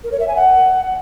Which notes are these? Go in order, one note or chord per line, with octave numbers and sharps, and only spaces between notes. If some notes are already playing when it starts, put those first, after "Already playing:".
A#4
C#5
E5
G#5
F#5